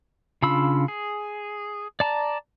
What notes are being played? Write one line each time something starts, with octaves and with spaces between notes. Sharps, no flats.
C#3 D4 F4 B5 E6
G#4
D5 A5 A#5